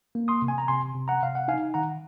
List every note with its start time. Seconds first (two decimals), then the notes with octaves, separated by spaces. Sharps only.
0.15 A#3
0.28 C6 D#6
0.42 C3
0.48 G#5
0.58 A#5
0.68 C3 G#5 C6
0.94 C3
1.08 F#5 A#5
1.22 C3 F5
1.35 F#5
1.48 D#4 F5 G#5
1.74 D#3 F#5 A#5